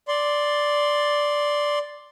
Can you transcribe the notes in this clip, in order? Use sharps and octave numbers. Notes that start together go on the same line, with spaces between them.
D5 C6